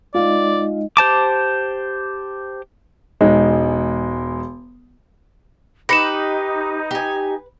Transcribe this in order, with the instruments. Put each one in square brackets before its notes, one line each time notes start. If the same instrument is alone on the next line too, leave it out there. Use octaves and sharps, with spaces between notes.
[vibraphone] G#3 D#4 D#5 [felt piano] F4 F5 [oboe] D5
[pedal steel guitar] G4 C5 A5 D6
[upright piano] E1 G#3 D#4
[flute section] D#4 [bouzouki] G4 [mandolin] B4 [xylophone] A#6 C#7 E7
[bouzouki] G4 G#5